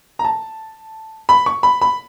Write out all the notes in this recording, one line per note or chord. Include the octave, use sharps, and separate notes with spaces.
A#5
A5
B5
C#6
B5
B5